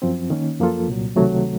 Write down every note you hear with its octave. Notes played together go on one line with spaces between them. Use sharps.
F#2 F3 C4
D#3 A#3 C#4
F#2 F3 A#3 F4 A4
C2 A#2 F#3
C#2 C3 D#3 F#3 A3